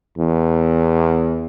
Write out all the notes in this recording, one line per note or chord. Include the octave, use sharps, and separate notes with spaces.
E2